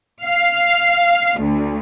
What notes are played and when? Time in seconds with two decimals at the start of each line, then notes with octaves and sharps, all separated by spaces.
0.24 F5
1.40 D2